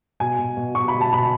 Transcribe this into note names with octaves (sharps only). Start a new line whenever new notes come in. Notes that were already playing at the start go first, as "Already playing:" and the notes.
B2 G#5
B2
B2
B2 C#6
B5
B2
A5
B2 B5